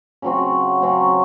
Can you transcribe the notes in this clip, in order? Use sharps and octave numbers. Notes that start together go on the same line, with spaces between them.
C#3 F#3 C4 F#4
C#3 F#3 C4 F#4